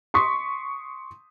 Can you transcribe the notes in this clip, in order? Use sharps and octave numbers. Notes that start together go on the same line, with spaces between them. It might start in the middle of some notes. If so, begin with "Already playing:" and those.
C6 C#6 D#6 B6